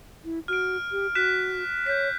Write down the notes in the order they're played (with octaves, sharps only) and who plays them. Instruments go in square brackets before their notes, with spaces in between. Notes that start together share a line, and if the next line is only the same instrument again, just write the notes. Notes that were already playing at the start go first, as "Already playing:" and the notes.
[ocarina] E4
[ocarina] F#4 [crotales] F6 D7
[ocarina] G4
[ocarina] F#4 [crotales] F#6 B6 E7
[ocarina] C#5 [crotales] G6 B6